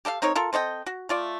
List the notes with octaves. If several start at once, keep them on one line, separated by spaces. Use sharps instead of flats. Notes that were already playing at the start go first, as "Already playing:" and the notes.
G4 A4 D#5 F5
C4 D#4 A#4 C#5
F4 A4 A#4
C4 A4 D#5 G5
F#4
A3 F4 D5